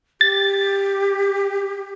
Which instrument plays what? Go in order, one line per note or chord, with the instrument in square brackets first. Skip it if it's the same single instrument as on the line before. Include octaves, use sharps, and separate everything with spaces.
[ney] G4 [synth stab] A6